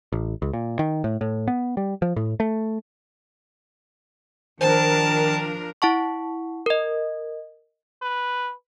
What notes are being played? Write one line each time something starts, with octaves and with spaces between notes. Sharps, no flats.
A1
C#2
A#2
D#3
A2
A2
B3
G3
F3
A2
A3
D#3 F3 D4 A#4 C5 A5
E4 F#5 A5 C#6
A#4 D#5
B4